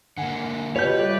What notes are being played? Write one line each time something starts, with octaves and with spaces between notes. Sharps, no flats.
D3 A#3 F#5 G#5
B2 F4 G4 B4 C#5 G6
G3 A3 D5